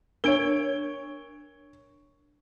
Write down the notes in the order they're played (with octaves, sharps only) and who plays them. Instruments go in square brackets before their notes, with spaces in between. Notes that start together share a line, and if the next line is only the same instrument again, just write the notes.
[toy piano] D4 A#4 [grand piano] C#5 D7 G7